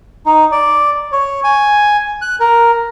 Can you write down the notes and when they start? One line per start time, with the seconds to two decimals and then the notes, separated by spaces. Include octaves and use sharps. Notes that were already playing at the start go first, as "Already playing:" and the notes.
0.26 D#4
0.52 D5
1.12 C#5
1.44 G#5
2.22 F#6
2.40 A#4